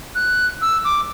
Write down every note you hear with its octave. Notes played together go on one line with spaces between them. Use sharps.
F#6
E6
D6